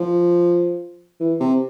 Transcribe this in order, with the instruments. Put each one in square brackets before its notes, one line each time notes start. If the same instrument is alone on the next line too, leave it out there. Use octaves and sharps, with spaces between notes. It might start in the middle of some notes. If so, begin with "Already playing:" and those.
Already playing: [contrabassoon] F3
E3
C3